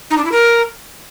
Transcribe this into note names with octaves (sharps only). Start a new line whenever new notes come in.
D#4
D4
E4
A#4